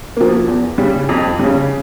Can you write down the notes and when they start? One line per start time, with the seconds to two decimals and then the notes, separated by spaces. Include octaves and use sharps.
0.17 F3 A#3
0.47 E2
0.78 C#3 G3
1.09 F2
1.39 C#3 G3